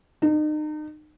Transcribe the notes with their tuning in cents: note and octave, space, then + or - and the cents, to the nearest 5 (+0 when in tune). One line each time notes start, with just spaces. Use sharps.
D#4 -35